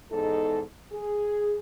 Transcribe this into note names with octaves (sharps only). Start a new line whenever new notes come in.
E2 G#2 D#4 A4
G#4